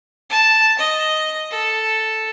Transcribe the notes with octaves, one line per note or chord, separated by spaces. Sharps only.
A5
D#5
A4